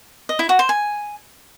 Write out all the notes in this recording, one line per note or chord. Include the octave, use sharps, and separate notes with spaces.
D#5
E4
F#4
C5
G#5